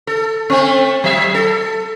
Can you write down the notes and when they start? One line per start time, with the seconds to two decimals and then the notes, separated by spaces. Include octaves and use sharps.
0.07 A4
0.50 A3 C4
1.04 F#3 E5
1.34 A4